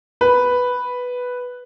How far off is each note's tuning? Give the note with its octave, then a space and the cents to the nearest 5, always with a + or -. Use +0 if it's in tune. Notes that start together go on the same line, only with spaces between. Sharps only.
B4 +0